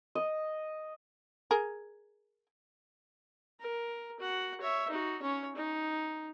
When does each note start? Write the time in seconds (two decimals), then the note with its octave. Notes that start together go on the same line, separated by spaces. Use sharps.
0.15 D#5
1.51 G#4 A#4
3.60 A#4
4.20 F#4 F#5
4.61 C#5 E5
4.90 D#4 F#4
5.22 C#4 C#5
5.56 D#4